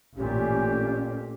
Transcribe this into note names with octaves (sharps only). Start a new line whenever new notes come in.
A1 A#2 C#4 G4